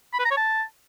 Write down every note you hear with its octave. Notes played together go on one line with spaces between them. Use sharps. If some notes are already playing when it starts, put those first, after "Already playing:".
B5
B4
A#5
C#5
A5